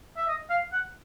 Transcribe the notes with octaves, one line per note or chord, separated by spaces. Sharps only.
E5
D#5
F5
F#5